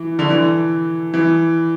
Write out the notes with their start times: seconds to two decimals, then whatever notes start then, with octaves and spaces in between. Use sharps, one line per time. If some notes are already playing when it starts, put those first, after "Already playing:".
Already playing: E3
0.19 D3
0.30 E3
1.14 E3